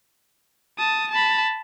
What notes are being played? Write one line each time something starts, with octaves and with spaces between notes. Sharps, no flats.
A5 D#6
A5 B5